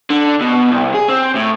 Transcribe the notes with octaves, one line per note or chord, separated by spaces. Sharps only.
D3
B2
C2
G#4
C4
A2